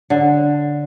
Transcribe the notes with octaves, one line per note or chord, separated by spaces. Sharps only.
D3